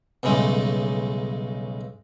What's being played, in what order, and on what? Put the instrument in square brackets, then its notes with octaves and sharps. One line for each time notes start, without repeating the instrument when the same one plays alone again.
[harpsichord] B1 G2 C#3 G#3 A3